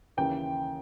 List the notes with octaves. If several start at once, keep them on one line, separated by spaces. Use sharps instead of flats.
D#2 C#3 E3 G5